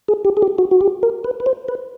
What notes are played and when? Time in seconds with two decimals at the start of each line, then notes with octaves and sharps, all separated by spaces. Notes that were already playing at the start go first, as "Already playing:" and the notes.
0.08 G#4
0.25 G4
0.37 G#4
0.42 G4
0.58 F#4
0.71 F#4
0.81 G4
1.03 A#4
1.24 B4
1.40 B4
1.46 C5
1.68 B4